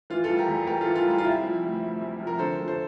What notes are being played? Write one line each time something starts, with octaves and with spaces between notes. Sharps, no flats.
E3 F4
F4 A4
G3
G4 A#4
E2
E2 G4 A#4
F4 A4
E3
F4
G3 F4
F4
C3 E4 G4
F3
D2
D2
C3
F3
A#4
D3 A4 C5
F3
A4 C5